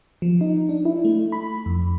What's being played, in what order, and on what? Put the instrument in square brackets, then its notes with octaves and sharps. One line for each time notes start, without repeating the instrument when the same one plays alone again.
[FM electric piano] F3
D#4
D4
E4
A3
B5
F2